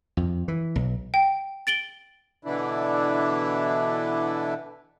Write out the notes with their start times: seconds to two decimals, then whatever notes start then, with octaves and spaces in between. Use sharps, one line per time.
0.17 F2
0.48 E3
0.76 B1
1.14 G5
1.67 A6 D7 F#7 G7
2.45 B2 D3 E3 D4 E4